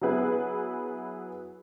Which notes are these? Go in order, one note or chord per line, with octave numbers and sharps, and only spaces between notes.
F#3 B3 E4 G#4 B4